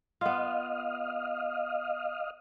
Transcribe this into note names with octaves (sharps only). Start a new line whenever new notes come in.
B3 F4 D#5 F5